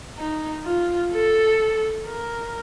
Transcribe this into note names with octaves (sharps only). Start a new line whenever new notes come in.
D#4
F4
A4
A#4